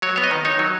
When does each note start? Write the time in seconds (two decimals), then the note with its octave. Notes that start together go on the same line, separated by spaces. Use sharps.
0.02 F#3 C#5
0.16 B3 C#5
0.24 D#5
0.31 D#3
0.45 D#4 C#5
0.59 F#3